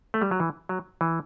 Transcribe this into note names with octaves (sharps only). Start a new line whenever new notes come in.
A3
G3
F#3
E3
F#3
E3